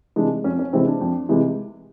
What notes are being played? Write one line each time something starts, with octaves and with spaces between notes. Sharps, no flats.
C3 E3 G#3 D4
F2 C#4
C#4
C3 E3 G#3 C4
D4
F2
C3 E3 G#3